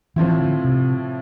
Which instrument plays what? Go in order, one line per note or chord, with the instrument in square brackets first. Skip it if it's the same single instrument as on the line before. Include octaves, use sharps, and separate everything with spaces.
[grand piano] A2 F3 C4 E4 [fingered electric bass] E3
[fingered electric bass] D3
C3